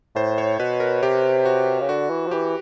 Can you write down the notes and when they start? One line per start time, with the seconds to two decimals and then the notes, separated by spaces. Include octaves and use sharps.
0.15 A2 C5
0.38 C#5
0.59 B2 B4
0.80 A#4
1.02 C3 G4
1.45 F#4
1.81 C#3
1.89 D3 F#4
2.10 E3
2.27 F3
2.31 E3 G4